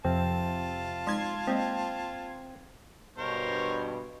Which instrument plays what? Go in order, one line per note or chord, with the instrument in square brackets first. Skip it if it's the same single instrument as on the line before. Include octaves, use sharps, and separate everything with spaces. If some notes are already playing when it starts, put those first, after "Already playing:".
[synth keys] F2 C3 [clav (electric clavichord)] C4 [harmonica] F4 A5
[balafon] G#3 D#4 [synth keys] C6 G#6
[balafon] G#3 A#3 D#5 [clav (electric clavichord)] C4
[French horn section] G2 B2 [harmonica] A#4 C5 C#5